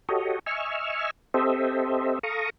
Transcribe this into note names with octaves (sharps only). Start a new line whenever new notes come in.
F#4 G4 A4 C#5 D#5
D#5 E5 G#5 C#6 E6 F6
C4 G4 A4 C5 D#5 E5
A4 F5 A#5 C#6 D#6